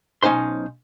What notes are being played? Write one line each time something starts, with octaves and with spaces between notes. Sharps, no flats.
B1 C#4 D#4 C5 C6